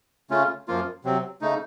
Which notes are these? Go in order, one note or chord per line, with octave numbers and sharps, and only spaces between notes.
C#3 A3 C#4 F4
F#2 F3 A#3 F4
C3 F#3 C4
C#3 A3 D#4